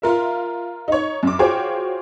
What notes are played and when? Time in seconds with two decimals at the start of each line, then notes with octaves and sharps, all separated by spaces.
0.02 F4 A#4 E5
0.88 D#4 C#5
1.23 F#2 D6
1.39 F4 F#4 G#4 C5 C#5 G5